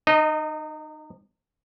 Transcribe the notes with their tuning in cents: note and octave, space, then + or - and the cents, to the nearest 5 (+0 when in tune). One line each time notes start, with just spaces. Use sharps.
D#4 -30 D#5 +0